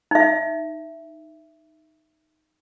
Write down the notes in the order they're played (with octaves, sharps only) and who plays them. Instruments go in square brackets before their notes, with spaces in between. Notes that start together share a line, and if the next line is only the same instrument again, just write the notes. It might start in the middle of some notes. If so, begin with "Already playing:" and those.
[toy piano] D#4 E5